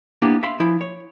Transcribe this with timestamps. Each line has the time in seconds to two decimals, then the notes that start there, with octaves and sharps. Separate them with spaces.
0.22 A#3 B3 D4 E4 G4
0.43 E5 F5 B5 C6
0.60 F3 E4
0.81 C#5